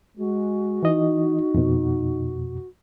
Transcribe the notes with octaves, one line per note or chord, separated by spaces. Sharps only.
G#3 F#4
E3 D#4 D#5
F2 B2